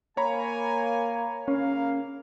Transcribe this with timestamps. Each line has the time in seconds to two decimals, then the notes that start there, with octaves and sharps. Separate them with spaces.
0.17 A#3 C#5 G#5 A#5 B5
1.48 C#3 A#3 C#4 F5